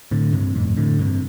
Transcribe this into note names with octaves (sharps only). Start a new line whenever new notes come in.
A2 D3
G2 C3
F2 A2
A2 D3
G2 C3